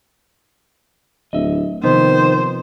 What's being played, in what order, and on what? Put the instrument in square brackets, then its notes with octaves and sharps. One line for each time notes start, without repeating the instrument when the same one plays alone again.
[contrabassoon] D1 [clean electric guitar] D#5 E5
[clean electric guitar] C3 F3 B3 [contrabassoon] D#3 [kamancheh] C5